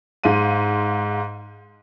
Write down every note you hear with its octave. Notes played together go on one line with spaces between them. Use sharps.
G#2 F5 C6 D#7